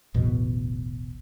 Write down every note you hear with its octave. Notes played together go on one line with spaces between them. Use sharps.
D1 A1 E2 B2